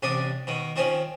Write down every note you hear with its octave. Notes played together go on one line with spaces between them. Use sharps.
A1 C3 D4 D5 D#6
B2 D#3
D#3 F3 C4 C#4